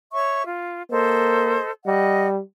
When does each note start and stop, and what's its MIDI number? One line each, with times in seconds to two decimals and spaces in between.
0.13 0.43 73
0.13 0.43 76
0.13 0.43 85
0.46 0.80 65
0.91 1.57 58
0.91 1.70 69
0.91 1.70 72
0.91 1.70 75
1.86 2.40 55
1.86 2.29 75
1.86 2.29 78